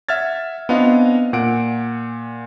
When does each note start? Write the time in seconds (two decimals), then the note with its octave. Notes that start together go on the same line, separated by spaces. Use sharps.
0.09 E5 F#5 F6 G#6 A6
0.69 B3 C4 D4 F4 D#5 F5
1.33 A#2 F#5 D7